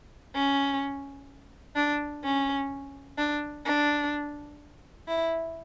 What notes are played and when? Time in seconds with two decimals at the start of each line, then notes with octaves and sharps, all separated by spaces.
0.35 C#4
1.76 D4
2.24 C#4
3.18 D4
3.65 D4
5.08 E4